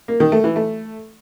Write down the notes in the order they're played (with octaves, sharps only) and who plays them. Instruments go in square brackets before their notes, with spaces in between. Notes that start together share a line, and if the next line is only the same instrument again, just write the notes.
[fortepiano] A#3
D#3
A3
E3
A3